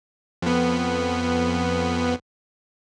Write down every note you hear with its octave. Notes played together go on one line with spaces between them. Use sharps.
F2 B3